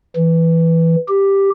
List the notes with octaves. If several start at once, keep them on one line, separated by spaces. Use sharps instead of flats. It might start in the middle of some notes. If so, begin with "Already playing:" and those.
E3
G4